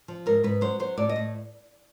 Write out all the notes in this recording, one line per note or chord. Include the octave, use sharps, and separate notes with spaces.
F3
G#2 A#4
G#2 B4
F#3 C5
F#3 C5
A2 D5
D#5
A2